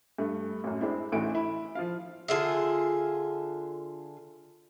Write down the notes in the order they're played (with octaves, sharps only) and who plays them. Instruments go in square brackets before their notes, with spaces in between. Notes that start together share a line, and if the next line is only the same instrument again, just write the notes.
[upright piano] G2 A3
A1 F#2
G#3 C4 D4 E4
A1 D2 E3 A3 D#4 D7
E4
F3 F4 F5
[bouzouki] D3 F4 G#4 E5